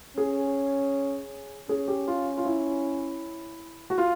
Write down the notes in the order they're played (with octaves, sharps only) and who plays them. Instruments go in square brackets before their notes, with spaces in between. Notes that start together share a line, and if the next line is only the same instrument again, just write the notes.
[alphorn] C#4 [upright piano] G#4
[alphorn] C#4 [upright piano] G#4
[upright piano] G4
F4
F4
E4
F#4
F4